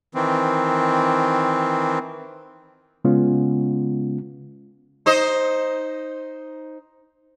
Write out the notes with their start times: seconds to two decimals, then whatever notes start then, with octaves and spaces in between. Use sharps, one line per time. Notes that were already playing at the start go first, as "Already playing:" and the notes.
0.15 D#3 E3 C4
3.04 C#3 G#3 B3 C#4 F4
5.06 D#4 C5 D#5